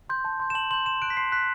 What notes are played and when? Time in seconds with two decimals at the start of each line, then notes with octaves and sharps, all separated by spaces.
0.10 C6 G6
0.25 A5
0.40 C6 G6
0.50 E7
0.55 A5 F#7
0.71 C6 G6 F#7
0.86 C6 E7
1.02 F#6 D7
1.10 B6
1.17 C6 C7
1.32 F#6 B6